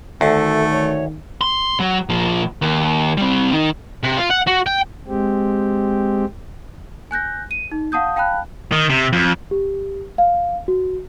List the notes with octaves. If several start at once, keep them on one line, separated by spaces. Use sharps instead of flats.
D2 D#3 A3 A4
C#5
C6
F#3
A#2 F3
D#2
G3 C4
D#3
C3
F4
F#5
F#4
G5
G#3 C4 G4
G#5 F#6 G6 A#6
D#7
D#4
F5 F#5 A5 D#6 G6
F5 G5 A5 B5 F#6
D#3
C3
F2
G4
F5
F#4